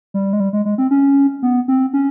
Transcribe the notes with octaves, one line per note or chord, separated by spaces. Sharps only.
G3
G#3
G3
G#3
G#3
C4
C#4
B3
C4
C#4